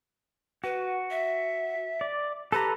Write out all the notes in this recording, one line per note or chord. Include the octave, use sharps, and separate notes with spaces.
F#4 B4
E5
D5
G4 A4 B4 A#5